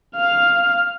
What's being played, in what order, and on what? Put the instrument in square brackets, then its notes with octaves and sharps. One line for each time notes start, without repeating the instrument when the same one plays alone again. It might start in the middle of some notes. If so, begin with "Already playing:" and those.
[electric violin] F5 F6